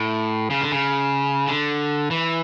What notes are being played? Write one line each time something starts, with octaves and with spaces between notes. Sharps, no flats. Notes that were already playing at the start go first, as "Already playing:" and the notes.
Already playing: A2
C#3
D3
C#3
D3
E3